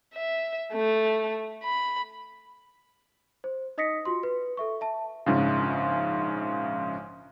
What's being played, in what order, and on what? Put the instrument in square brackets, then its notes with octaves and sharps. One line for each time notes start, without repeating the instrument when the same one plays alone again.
[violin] E5
A3
B5
[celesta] C5
D#4 D#5 D#6 A#6 B6 C#7
F4 F#4 C6
B4
A4 E5 C#6
E5 A5
[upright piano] A#1 G#2 C#3